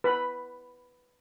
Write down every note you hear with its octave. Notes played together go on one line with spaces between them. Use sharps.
B4 B5